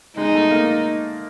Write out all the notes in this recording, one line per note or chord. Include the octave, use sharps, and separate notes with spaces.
G#3 D#4
A3
A#3